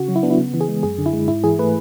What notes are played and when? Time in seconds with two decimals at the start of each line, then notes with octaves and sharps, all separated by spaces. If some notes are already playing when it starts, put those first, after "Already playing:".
Already playing: C#3 F#4
0.08 F#3
0.16 E4
0.23 B3 D4
0.30 E4
0.38 C#3
0.54 E3
0.61 G#4
0.68 G#3
0.83 F#2 G#4
0.98 D3
1.06 E4
1.13 G#3
1.28 G#2 E4
1.44 E3 G#4
1.59 A3 B4